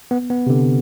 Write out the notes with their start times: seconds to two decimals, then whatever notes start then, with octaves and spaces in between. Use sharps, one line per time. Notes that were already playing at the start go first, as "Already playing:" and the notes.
0.11 B3
0.30 B3
0.47 C3
0.50 D3